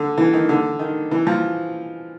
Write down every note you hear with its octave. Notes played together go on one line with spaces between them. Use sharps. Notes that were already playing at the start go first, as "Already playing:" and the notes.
Already playing: D3
E3
D#3
D3
D#3
E3
F3